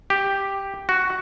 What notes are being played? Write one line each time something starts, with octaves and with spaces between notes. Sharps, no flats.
G4
F#4